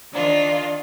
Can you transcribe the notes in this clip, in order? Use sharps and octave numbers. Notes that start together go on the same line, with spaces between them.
D#3 D4 F4